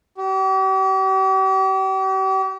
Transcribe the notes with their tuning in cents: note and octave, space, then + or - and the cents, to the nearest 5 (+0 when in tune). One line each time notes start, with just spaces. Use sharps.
G4 -40